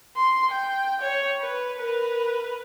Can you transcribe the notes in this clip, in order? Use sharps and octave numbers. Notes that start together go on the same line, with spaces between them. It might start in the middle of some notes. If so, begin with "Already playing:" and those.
C6
G5
C#5
B4
A#4 B4